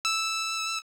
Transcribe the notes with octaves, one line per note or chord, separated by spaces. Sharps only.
E6